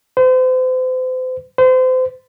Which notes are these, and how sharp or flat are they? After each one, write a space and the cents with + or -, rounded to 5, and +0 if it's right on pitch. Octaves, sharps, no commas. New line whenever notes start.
C5 -40
C5 -35